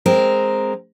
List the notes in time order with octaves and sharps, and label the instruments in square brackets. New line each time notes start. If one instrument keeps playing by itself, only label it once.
[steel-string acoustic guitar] G#3 C4 A#4